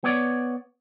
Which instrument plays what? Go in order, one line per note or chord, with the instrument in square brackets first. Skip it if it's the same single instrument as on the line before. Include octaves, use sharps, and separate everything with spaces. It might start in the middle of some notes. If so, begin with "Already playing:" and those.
[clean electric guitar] B3 C#5 D5